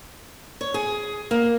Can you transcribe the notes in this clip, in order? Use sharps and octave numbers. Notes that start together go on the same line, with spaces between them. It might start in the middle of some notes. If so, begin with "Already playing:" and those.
C#5
G#4
A#3